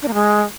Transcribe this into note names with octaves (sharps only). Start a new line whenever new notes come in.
D4
A#3
G#3